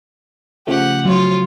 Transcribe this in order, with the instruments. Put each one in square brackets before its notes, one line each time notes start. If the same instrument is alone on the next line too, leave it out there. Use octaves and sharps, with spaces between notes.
[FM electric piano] C#3 F3 A3 [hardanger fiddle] G4 F#5
[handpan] F#3 [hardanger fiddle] F4 C#5